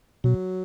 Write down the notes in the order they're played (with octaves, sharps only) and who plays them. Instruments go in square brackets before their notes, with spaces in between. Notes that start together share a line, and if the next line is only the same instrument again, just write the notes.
[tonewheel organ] B2 [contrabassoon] F#3